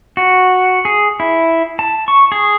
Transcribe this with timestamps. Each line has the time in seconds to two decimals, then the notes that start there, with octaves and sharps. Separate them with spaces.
0.17 F#4
0.85 G#4
1.20 E4
1.79 A5
2.08 C#6
2.32 G#4